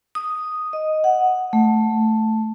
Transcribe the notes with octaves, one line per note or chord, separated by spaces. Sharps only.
D#6
D#5
F#5
A3